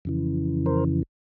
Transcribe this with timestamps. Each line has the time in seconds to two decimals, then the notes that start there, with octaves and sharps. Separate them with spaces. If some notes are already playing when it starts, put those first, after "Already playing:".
0.05 F2 C#3 E3
0.66 A#4 C5